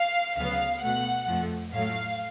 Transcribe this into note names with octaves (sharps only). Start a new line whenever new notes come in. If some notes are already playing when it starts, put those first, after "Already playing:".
Already playing: F5
D2 C#3 F#3 B3 F5
B2 A3 F#5
F2 F3 A3
A2 F#3 A3 F5